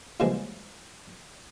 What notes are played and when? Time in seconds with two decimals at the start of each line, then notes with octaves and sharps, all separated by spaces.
0.20 A#2 C#3 E3 F3 G3 G#3